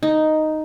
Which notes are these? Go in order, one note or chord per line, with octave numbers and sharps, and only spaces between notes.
D#4